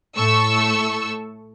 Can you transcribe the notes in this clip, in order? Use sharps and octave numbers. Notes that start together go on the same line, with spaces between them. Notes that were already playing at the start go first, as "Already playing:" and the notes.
A2 A3 A4 C#6 E6